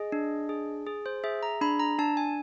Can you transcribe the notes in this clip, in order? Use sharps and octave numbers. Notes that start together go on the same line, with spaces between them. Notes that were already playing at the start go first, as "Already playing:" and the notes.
Already playing: G#4 D#5
D4
G#4
G#4
C5
G#4 E5
A#5
D4 B5
A#5
D4 A5
G#5